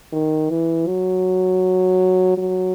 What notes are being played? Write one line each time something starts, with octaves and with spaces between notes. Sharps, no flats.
D#3
E3
F#3
F#3